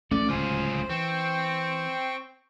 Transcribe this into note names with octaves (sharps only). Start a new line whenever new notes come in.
A1 A3 C#4 D5
D1 C#2 F4 G#4 C5
E3 C4 G5 C#6